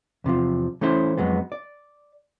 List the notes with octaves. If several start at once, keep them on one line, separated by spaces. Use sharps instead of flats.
E2 C3 E3 F3
E3 A3 C#4 E4 C5
F2 F#3 G#3 B3
D5